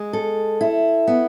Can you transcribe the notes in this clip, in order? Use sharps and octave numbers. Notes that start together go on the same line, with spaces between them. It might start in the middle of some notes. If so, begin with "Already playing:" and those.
Already playing: G#3
A4
E4
B3